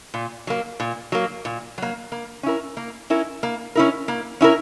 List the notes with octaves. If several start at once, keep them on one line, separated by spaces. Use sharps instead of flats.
A#2
F#3 A#3
A#2
F#3 A#3
A#2
F#3 A#3
A#3
C#4 E4 A#4
A#3
C#4 E4 A#4
A#3
C#4 E4 A#4
A#3
C#4 E4 A#4